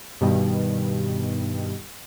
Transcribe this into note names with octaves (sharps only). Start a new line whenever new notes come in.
G2 B2 D#3 G3